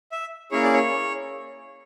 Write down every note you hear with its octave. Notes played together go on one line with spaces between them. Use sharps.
E5
A#3 C#4 E4 G#4 C#5
D5
C#5